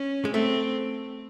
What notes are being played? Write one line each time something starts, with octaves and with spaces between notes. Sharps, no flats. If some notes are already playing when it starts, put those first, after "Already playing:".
Already playing: C#4
G#3
A3 C4